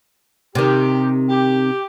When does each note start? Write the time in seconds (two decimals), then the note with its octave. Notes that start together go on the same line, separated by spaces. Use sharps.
0.55 C3 D#3 G4
1.28 G4